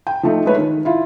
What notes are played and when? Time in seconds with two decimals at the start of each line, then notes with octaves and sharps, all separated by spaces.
0.07 G5
0.23 F3 A3 D#4
0.46 G#3 A3 B4 C#5
0.58 D#3
0.85 E4 F4